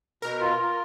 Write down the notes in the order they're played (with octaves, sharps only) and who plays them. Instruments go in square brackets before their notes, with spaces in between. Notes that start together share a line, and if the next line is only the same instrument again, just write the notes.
[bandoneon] B2 [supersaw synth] A#4
[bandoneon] F4
F4